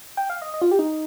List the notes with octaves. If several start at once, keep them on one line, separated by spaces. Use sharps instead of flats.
G5
F5
D#5
D#5
F4
G4
D#4